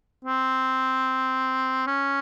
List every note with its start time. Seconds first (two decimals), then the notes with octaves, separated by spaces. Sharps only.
0.25 C4
1.87 C#4